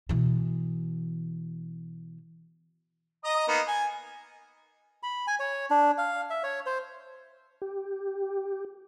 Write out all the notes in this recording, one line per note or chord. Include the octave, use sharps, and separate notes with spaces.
B2 E3
D#5 A#5 D#6
A#3 B3 D#4
G#5
B5
G#5
C#5
D4
F5
E5
C#5
C5
G4